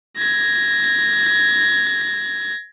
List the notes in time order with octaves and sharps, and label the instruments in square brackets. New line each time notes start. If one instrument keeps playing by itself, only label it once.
[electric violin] G#6 A#6